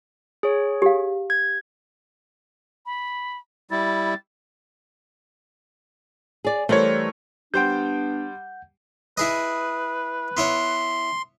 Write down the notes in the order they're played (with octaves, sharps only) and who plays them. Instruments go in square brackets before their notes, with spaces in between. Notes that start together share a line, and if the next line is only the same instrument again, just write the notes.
[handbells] G#4 C#5
[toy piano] G4 F5
[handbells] G#6
[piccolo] B5
[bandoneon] G3 E4 [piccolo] A6
[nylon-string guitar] G#4 D5
[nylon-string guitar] E3 G3 C5 [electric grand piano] A3 A#4 C#5
[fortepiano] G3 C5 G5 [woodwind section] B3 D4 [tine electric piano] F#5 G6
[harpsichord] E4 G#4 D#5 [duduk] B4
[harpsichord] B3 E4 C#5 [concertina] C6